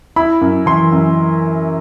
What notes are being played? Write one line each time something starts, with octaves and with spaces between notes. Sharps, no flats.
E4 B5
F#2
E3 C6
F#2